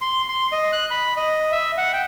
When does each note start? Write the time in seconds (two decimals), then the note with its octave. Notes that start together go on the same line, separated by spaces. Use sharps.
0.01 C6
0.29 C6
0.52 D#5
0.72 F#6
0.91 B5
1.17 D#5
1.52 E5
1.78 F#5
1.93 G5